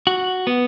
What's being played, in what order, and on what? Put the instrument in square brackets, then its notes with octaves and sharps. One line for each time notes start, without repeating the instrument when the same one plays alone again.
[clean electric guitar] F#4
B3